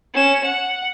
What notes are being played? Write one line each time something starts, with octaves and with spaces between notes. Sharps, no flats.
C#4 E7
F#5